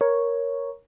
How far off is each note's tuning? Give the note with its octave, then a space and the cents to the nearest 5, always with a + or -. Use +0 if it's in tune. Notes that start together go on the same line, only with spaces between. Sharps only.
A#4 +10 C#5 +0